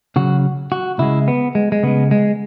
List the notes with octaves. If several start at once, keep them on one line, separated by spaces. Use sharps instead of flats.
C#3 F#3 F#4
F#4
C#3 G#3 E4
B3
G#3
G#3
C#3 G#3 B3
G#3